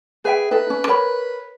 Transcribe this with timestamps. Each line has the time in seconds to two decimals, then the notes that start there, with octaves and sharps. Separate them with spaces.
0.25 G#4 B4 E5 G5
0.51 D#4 A4 B4
0.70 C#4
0.87 A#4 C#5 B5